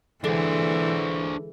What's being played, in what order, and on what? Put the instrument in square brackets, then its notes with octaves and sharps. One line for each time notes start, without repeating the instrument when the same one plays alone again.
[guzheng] D3 G#3 [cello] E3 [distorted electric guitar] D4 C5